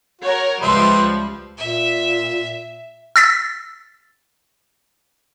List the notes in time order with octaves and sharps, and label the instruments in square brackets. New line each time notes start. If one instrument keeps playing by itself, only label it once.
[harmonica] F#4 [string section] A#4 C#5
[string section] C#2 F3 G3 [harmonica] B4 E5 C6
[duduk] A#2 [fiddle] E5
[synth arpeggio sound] E6 A6 B6